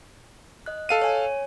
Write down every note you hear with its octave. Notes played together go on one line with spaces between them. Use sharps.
D#5 F#6
A4 F5 D#7
C#5 G#5